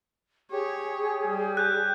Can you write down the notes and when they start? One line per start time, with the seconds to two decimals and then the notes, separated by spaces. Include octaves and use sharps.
0.52 G4 G#4 C#5
1.24 G3
1.57 F#6 G6